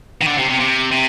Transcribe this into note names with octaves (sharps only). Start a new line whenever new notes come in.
D#3
D3
C3
C3
C3
C3